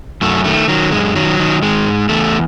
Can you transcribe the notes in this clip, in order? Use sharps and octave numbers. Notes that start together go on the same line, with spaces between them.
F#2 A3
D#3 A3
D#3 F#3
F#2 G#3
D#3 F#3
D#3
D#3 G#3
G#2
E2 A3